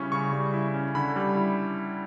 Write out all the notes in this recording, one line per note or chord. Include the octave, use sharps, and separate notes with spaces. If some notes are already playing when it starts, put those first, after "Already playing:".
Already playing: C#3 G3 C#4 E4 C#6
C#3 C#6
G3
E4
C#4
D3 B5
G3
E4